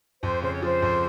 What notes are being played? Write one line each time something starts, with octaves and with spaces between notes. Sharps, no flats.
F2 C5
C#3 C5
C#5
F3 C5
F2